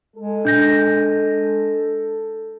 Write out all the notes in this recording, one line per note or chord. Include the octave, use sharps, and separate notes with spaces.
G#3 A4
D4 G6 A#6